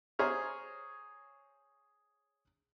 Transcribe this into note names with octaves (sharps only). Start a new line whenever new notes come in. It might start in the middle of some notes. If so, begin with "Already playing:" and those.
G#4 C5 C#5 A#5 F6